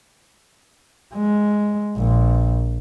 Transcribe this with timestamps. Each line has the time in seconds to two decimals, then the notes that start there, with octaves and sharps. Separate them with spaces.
1.15 G#3
1.97 A#1